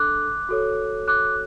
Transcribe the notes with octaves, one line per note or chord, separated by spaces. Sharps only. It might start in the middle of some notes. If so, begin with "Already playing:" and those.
Already playing: D4 A4 D6 F#6
F#4 A4 C#5
D6 F#6